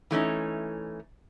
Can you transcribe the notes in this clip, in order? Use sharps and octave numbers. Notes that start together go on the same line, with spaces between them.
E3 A3 C#4 D#4